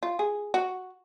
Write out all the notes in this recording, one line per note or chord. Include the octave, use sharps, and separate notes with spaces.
F4
G#4
F#4